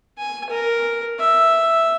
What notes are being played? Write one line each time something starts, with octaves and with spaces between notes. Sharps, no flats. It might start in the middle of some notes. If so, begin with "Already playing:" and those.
G#5
A#4
E5